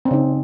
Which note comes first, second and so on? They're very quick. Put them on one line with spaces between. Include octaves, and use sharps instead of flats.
C4 C#4 C#3 D#4